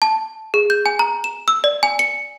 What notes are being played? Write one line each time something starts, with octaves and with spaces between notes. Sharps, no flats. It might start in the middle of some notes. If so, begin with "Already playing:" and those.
A5
G#4
G6
G#5
A#5
E7
E6
D5
G#5
C#7